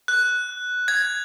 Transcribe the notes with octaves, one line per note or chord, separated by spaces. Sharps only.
F#6
G#6